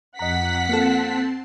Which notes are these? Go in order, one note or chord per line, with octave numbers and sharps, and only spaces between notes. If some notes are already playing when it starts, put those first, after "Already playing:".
F2 D#5 F#5 A#5 B6
A#3 C4 F4 A4 A5 C7